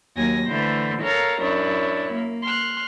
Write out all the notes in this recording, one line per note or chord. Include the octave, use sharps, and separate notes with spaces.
D#2 F#3 A#3 G#5 A#6
D3 E3 A3 C5
A4 A#4 C#5 F5 A#5
F#2 D4 E4 C#5
A#3
C6 F6 F#6